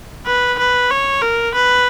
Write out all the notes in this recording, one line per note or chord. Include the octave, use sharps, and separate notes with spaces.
B4
B4
C#5
A#4
B4